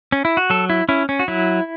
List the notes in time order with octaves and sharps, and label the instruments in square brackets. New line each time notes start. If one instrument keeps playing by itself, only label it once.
[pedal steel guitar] C#4
E4
F#4
F#3 A4
E4
C#4 E4
C#4
F#4
F#3 E4